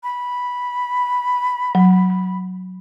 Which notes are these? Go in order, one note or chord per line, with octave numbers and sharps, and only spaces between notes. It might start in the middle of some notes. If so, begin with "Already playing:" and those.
B5
F#3